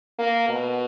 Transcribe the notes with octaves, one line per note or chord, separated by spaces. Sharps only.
A#3
B2